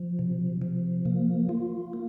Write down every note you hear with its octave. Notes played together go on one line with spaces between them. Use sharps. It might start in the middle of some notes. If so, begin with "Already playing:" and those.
Already playing: F3
C3
F3
A#3
F4
A#3